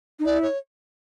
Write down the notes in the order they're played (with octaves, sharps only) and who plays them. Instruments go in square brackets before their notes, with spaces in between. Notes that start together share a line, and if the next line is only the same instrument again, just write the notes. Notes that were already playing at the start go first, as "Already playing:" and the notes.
[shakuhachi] D#4
[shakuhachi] E4 [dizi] D5
[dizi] C#5